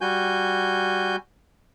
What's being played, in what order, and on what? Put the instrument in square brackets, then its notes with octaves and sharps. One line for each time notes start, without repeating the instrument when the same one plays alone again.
[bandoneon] G3 F#4 G#5 G6